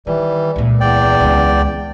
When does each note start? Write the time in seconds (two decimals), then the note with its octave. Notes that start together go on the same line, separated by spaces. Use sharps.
0.07 D#3 E3 G3
0.56 C#2 A#2
0.81 E2 D5 G5
1.21 C#2 C4